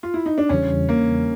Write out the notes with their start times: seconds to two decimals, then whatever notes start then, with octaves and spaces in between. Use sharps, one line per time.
0.03 F4
0.14 E4
0.26 D#4
0.38 D4
0.49 E2 C#3 E3 G3 C#4
0.89 A#3